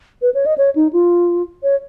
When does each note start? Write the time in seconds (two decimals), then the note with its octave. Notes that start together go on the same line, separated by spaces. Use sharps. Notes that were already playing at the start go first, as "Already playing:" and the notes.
0.22 B4
0.34 C#5
0.46 D#5
0.58 C#5
0.75 D#4
0.93 F4
1.63 C#5